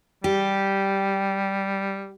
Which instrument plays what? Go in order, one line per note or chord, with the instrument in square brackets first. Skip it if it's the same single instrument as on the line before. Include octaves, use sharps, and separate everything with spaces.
[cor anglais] G3 [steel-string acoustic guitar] G4